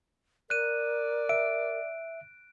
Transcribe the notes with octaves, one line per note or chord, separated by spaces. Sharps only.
A#4 D5 F#6 D#7
E5 D7